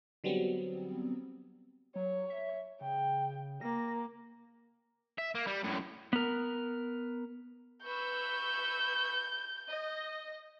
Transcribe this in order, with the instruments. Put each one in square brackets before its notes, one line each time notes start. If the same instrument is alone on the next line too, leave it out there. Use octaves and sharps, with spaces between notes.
[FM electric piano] D3 F#3 G3 B3 C4
[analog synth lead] F#3 [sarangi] C#5
[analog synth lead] E5
[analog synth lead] C#3 [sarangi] G5
[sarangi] A#3 [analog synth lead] A#6
[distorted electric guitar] E5
A#3
G3
F#2 A2
[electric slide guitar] B3 A#4
[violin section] B4 C#6 E6 [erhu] G6
[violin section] D#5